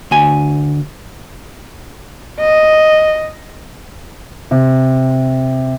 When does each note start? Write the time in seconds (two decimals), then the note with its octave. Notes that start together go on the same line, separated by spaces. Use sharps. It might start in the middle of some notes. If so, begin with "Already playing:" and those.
0.11 D2 G#5
2.40 D#5
4.51 C3